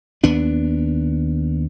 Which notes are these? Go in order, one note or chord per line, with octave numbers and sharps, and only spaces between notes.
D#2 B3 D4